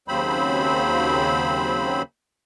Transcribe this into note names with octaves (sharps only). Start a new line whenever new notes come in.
D#2 C#3 F#3 C4 C5 B5